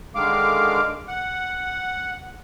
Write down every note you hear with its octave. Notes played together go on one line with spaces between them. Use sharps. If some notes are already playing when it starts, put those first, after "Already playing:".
D3 D#3 G#3 F5 D6
F#5